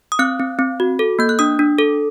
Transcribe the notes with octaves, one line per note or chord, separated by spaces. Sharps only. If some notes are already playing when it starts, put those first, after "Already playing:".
D#6
C4 F#6
C4
C4
F#4
A4
A#3 G6
F#6
D4 D#6
D4
A4